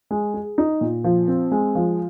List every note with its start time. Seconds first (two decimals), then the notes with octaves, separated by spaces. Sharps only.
0.11 G#3
0.34 G#4
0.58 D#4
0.81 A#2
1.04 F3
1.28 C4
1.52 G#3
1.75 F3